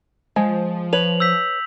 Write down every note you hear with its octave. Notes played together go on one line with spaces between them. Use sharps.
F3 G#3
B4 C#5 F7 F#7
E6 G6 B6